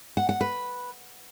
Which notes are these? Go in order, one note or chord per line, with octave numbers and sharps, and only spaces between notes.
F#5
F#5
B4